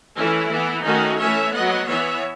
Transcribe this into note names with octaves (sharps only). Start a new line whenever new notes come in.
E3 A3 C#4 E4
E3 B3
D#3 A3 C#4 D#4 F#4
E3 A3 C#4 C#5 E5
F#3 B3 D#5 F#5
E3 B3 C#5 E5